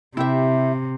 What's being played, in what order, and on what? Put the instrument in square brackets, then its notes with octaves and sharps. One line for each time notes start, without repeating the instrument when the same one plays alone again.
[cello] C3 [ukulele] E4 G4 E5